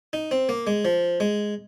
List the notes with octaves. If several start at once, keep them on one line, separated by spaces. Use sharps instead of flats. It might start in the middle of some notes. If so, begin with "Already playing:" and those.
D#4
C4
A#3
G#3
F3
G#3